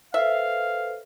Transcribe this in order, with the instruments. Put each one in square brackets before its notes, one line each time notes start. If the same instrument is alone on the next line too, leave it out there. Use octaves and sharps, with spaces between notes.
[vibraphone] A4 B4 C5 [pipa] E5 [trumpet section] F5